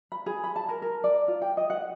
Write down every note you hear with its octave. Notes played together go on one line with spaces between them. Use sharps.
B5
G#4
B5
A5
A#4
A#4
D5
F4
G5
D#5
F#5